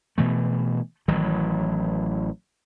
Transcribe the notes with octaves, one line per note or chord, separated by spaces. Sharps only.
B2 E3 A3
A1 D#3 E3 F#3